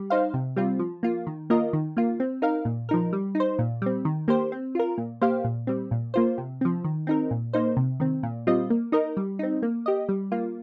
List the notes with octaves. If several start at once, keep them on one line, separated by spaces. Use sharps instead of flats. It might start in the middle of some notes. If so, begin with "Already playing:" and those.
Already playing: G3
D#4 C5 F5
C3
G3 C4 F4
F3
A#3 F4
D#3
A#3 F4 A#4 D#5
D#3
A#3 F4
C4
D#4 A#4 F5
A#2
F3 D#4 A#4
G3
D#4
C5
A#2
G3 C4
D#3
A#3 G4 C5
C4
F4 A#4
A#2
A#3 G4 C5 F5
A#2
G3 C4
A#2
A#3 F4 C5
C3
F3 C4
D#3
C4 D#4 A#4
A#2
A#3 D#4 C5
C3
D#3 C4
A#2
G3 C4 F4 D#5
A#3
D#4 A#4 D#5
G3
C4 D#4
A#3
G4 D#5
G3
A#3 F4